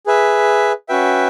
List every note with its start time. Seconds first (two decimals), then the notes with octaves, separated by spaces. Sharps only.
0.06 G#4 B4 E5
0.89 C#4 F#4 B4 E5 G5